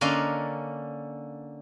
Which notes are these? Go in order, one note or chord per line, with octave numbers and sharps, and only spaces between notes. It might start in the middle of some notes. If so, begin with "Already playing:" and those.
D3 A#3 C#4 D5 D#5 C6